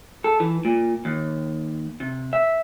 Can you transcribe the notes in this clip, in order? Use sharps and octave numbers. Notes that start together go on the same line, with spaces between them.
A4
E3
A#2
D#2
C3
E5